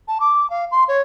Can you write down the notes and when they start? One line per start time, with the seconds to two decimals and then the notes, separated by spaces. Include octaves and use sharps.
0.08 A5
0.20 D6
0.50 F5
0.72 C6
0.88 C#5